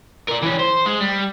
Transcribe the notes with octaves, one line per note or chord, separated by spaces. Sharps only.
A#4 D5
E3 C#4
C5
G#3
G3